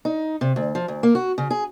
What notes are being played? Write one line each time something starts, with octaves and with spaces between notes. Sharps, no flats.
D#4
C3
D2
F3
D2
A#3
F#4
C#3
G#4